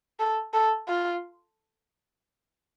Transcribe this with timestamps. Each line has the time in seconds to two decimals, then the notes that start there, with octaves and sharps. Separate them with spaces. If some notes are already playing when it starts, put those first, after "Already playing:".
0.20 A4
0.54 A4
0.88 F4